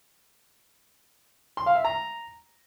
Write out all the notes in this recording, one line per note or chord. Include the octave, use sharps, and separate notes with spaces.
C6
F5
E5
A#5